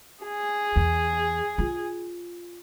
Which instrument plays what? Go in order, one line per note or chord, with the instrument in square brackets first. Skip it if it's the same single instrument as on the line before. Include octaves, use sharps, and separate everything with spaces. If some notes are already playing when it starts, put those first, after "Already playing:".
[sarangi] G#4
[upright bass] E2
F4